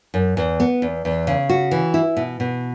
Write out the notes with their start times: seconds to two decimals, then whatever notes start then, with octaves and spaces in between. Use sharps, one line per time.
0.14 F#2
0.37 E2
0.60 B3
0.82 E2
1.05 E2
1.27 C#3
1.49 F#4
1.71 E3
1.94 E4
2.17 B2
2.40 B2